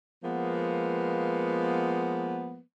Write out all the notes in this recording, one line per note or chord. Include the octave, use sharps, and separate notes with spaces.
F3 G#3 A#3 B3